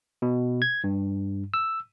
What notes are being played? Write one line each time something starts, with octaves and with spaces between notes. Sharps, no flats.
B2
G#6
G2
E6